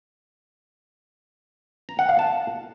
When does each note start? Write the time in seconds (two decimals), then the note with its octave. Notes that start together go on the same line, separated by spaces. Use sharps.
1.89 A#5
1.99 F#5
2.09 F5
2.19 A5